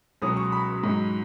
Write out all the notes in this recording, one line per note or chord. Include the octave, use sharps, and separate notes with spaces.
C#2 B2 F#3 C#4 D#6
C#6
B5
G#2 F#3 D#4